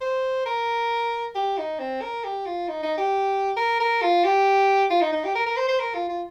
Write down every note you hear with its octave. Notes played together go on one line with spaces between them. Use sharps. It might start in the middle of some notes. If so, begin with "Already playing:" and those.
C5
A#4
G4
D#4
C4
A#4
G4
F4
D#4
D#4
G4
A#4
A#4
F4
G4
F4
D#4
D#4
G4
A#4
A#4
C5
C5
A#4
F4
F4